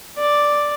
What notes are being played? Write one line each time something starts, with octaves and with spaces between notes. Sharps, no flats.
D5